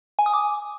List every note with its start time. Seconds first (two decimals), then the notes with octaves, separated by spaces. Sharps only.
0.19 G#5
0.26 D#6
0.33 D6